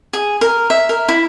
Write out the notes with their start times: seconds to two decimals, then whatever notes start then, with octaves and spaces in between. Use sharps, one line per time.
0.13 G#4
0.41 A#4
0.70 E5
0.89 A#4
1.09 E4